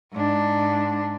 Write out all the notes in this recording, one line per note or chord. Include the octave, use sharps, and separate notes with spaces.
G#2 D4